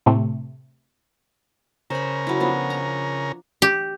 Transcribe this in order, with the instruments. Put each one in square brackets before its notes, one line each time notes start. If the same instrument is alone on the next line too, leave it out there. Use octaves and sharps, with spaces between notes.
[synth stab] A2 C3 A3
[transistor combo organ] C#3 A#4 [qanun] C5 B5
[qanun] F#3 E4
F3 B3 D4
A#5
[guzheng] G4